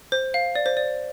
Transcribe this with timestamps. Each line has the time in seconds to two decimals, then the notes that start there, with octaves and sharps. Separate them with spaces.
0.12 C5
0.34 F5
0.55 D5
0.66 C5
0.77 D5